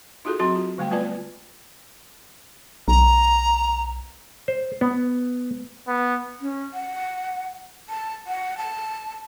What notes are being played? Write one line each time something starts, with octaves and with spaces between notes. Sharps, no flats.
D#4 F4 F#4 G#4 A4
F#3 C4 F#4 G#4 A5 C6
F4
D3 G3 A3 G5
A3 B3 F4 B4 D5 A5
B1 A#5
C5
B3
B3
C#4
F#5
A5
F#5
A5